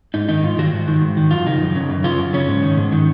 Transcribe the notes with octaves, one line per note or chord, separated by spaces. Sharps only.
G#2 D#4
D#3 D#4
G#2 F4
D#3 F#4
G#2
D#3
G#2
D#3
F#2 F4
C#3 D#4
F#2
C#3
F#2
C#3 F4
F#2
C#3 C#4
G#2
D#3
G#2
D#3